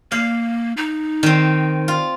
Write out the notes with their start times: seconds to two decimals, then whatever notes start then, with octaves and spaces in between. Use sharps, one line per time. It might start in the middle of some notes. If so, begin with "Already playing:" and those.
0.12 A#3 F5
0.77 D#4
1.23 D#3 C4
1.88 F4